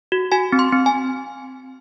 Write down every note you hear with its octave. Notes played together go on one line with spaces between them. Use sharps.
F#4
F#4 G#5
C4
C6
C4
G#5